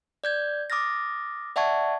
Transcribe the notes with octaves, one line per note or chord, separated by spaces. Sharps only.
D5 G6 G#6
D6 D#6 F6 A6 A#6
D5 E5 F#5 A5 C#6 G#6